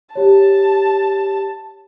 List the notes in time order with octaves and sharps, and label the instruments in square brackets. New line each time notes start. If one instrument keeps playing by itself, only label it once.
[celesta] G4 C#5 [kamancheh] A5